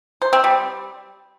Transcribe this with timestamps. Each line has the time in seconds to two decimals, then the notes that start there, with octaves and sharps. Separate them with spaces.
0.22 C5
0.33 C4
0.44 G3